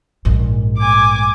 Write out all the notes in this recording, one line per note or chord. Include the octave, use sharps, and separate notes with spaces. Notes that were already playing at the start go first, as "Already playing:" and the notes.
A#1 G#2
G#5 D6